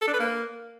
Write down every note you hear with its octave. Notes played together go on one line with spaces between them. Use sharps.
A4
D4
B4
A#3